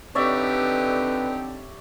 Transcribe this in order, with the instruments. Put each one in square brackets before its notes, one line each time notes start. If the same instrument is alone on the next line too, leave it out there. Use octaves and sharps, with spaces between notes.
[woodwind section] D3 C4 [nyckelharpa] D#4 G4 [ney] B4 [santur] C#5 D5 E5